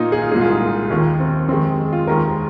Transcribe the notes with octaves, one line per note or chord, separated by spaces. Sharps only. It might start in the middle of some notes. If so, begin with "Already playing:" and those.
Already playing: A#2 A#3 D#4 F4
G#4
F4
C2 A#2 G#3 G#4
F4
D#4
D#2 D#3 A#3
C4
F2 D#3 G#3 C4
F4
D#2 D#3 G#3 A#4